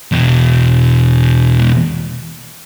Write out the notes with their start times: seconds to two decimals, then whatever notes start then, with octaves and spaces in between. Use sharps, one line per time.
0.12 E2 B2